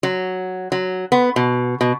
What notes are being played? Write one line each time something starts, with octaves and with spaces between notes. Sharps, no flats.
F#3
F#3
B3
B2
B2